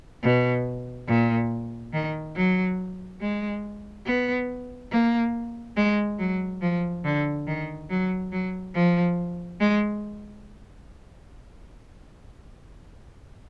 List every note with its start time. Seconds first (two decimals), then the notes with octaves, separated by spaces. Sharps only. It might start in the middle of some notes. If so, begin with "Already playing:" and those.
0.23 B2
1.08 A#2
1.93 D#3
2.36 F#3
3.21 G#3
4.06 B3
4.91 A#3
5.76 G#3
6.19 F#3
6.62 F3
7.05 D3
7.47 D#3
7.90 F#3
8.32 F#3
8.75 F3
9.60 G#3